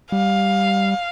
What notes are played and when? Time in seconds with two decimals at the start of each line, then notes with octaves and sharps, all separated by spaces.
0.12 G3 F5